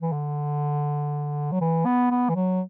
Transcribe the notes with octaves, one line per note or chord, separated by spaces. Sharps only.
E3
D3
F#3
E3
B3
B3
E3
F#3